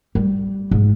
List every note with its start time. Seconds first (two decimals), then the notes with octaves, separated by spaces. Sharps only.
0.15 G3
0.71 G#2